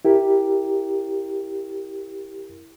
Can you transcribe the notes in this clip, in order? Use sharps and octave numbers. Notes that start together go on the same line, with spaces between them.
E4 G4 A#4